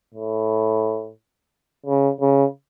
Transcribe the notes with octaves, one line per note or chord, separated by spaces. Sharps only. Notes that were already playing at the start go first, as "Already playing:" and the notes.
A2
C#3
C#3